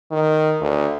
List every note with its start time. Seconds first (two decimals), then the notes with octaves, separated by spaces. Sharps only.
0.11 D#3
0.61 D2